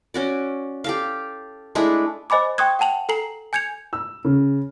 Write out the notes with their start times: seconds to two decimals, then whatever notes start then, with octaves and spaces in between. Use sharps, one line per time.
0.14 C#4 F#4 D5
0.84 G4 A4 F5
1.75 G#3 A3 D4 E4
2.30 C5 D#5 G#5 B5 D6
2.58 G5 C6 C#6 D#6 F#6 G#6
2.79 F#5 G5 A5 F7 F#7
3.09 A4 G#5 A#5 C7 F#7
3.53 G#5 G6 G#6 C#7 F7
3.93 E6
4.25 C#3